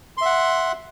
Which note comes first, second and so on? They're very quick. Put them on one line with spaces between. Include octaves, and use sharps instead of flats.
C6 E5 F#5